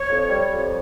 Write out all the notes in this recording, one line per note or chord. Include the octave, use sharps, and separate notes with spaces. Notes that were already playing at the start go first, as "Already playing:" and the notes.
Already playing: C#5
F2
G3
F2